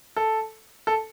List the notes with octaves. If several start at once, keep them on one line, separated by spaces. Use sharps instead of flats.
A4
A4